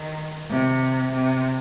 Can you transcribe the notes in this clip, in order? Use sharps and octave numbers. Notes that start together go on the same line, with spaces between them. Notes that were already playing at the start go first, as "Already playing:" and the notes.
Already playing: D#3
C3
C3